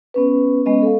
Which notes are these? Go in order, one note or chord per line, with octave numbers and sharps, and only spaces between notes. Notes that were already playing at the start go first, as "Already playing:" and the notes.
B3 C#4 B4
G#3 B3 C#4 D#5
A4 F5